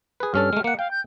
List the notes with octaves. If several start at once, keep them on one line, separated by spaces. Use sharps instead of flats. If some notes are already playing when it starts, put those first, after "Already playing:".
G#4 B4
G2 C#4 A4 F6
G#3 A3
A#3 F#5 C#7
F5 G5
G6